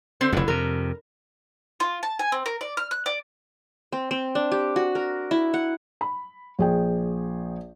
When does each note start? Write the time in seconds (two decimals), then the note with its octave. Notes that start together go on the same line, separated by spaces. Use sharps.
0.21 D3 C4 C5
0.33 F1 F2 D3 E4
0.48 F2 C3 A#4
1.80 F4
2.03 A5
2.19 G#5
2.32 C4
2.46 A#4
2.61 D5
2.77 F6
2.91 F#6
3.06 D5
3.92 C4
4.11 C4
4.35 D4
4.52 G4
4.76 F#4
4.95 A#4
5.31 E4
5.54 F#5
6.01 B5
6.59 A#1 G#4 G5